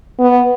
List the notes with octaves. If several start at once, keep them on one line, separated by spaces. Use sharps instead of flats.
B3